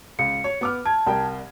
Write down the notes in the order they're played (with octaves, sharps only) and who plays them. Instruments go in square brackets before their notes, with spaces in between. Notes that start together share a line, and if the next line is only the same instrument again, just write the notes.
[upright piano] C#2 [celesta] C#7
[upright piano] C#5
B3 D6 F6
[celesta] A5 [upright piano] G#6
[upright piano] C2 A#4 G5